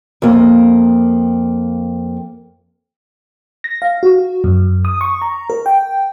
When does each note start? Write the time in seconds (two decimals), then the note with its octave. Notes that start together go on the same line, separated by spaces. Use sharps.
0.22 F2 A#3
3.64 A#6
3.82 F5
4.03 F#4
4.44 F#2
4.85 D#6
5.01 C#6
5.22 A#5
5.50 A#4
5.66 G5